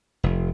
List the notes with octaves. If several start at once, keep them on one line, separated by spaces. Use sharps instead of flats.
F1